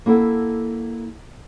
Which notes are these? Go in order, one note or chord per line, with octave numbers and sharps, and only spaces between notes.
A#3 E4 A4 F#5